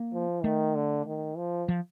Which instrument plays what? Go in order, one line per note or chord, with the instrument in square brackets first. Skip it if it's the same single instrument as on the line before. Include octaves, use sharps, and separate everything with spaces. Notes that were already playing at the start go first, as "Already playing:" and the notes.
Already playing: [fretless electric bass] A#3
[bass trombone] F3
[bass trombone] D#3 [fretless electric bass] A3
[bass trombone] D3
D#3
F3
[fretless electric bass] F3